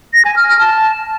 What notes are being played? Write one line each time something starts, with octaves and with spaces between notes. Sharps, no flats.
A#6
G#5
F6
F6
A5